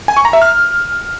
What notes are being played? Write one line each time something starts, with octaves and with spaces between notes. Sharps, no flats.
G#5
C#6
A#5
E5
F6